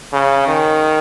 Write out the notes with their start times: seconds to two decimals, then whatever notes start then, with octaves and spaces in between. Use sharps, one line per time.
0.13 C#3
0.48 D#3